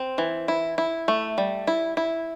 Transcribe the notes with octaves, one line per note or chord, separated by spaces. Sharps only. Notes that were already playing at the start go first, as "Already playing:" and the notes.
Already playing: C4
E3
E4
E4
A3
G3
E4
E4